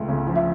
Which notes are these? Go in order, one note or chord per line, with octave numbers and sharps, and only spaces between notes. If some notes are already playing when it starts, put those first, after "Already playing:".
Already playing: C#2 A3
C#3
F3
E5